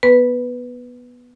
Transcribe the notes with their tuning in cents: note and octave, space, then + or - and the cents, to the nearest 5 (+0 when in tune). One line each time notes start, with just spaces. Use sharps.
B3 -10 B4 +0